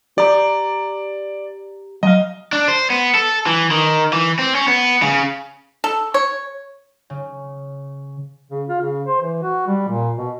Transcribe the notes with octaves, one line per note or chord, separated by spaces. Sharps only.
G4 D5 A#5
F#3 D#5 F5
D4
C5
B3
A4
E3
D#3
E3
C4
C#4
B3
C#3
A4
C#5
C#3
C#3
F4
C#3
C5
E3
F#4
G3
A#2
B2